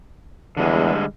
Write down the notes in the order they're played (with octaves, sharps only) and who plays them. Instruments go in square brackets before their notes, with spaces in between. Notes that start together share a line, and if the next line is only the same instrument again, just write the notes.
[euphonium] E2 [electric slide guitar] D3 G3 G#3